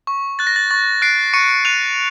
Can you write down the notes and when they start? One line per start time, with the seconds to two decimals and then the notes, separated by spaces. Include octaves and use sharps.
0.07 C#6
0.39 F#6 A6
0.47 A#6
0.56 A6
0.71 C#6 A6
1.02 F#6 C7 D7
1.33 C#6 C#7 D#7
1.65 F#6 D#7 F7